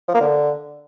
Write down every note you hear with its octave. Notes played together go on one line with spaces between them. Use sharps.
F3
A#3
D3